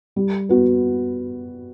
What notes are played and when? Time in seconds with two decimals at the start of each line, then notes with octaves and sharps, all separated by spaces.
0.16 G3
0.49 B3 F#4 B4